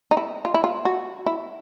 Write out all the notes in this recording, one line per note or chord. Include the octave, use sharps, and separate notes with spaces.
D#4
E4
F4
E4
F4
F#4
E4